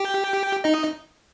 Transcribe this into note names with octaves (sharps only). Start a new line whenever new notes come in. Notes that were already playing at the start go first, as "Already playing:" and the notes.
Already playing: G4 G5
D#4 D#5